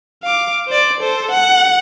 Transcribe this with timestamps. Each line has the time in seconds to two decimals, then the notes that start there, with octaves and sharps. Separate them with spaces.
0.23 F5 D6
0.67 C5 D5
1.00 A4 C5
1.31 F#5